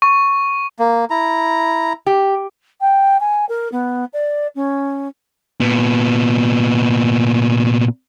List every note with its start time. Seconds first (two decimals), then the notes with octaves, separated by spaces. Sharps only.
0.02 C#6
0.79 A#3
1.10 E4 A#5
2.06 G4
2.81 G5
3.20 G#5
3.49 A#4
3.72 B3
4.13 D5
4.55 C#4
5.61 A#2 B3